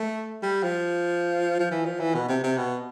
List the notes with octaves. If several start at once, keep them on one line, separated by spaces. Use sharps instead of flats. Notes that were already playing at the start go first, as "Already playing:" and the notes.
Already playing: A3
G3
F3
F3
E3
F3
E3
B2
C3
C3
B2